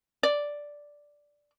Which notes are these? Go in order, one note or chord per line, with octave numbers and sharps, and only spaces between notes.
D5